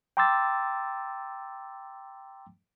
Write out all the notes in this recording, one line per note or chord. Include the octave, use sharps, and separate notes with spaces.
G5 A#5 C6 D6 E6 A6